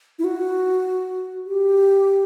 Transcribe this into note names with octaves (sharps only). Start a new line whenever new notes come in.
E4
F#4
G4